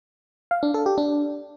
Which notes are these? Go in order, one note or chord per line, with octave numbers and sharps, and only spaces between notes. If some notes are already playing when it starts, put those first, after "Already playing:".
F5
D4
A4
G4
D4